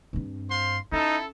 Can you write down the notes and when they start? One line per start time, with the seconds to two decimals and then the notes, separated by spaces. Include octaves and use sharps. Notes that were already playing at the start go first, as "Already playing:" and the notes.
0.13 G2 C4
0.50 C5 F5 C6
0.92 C#4 D#4 E4 A4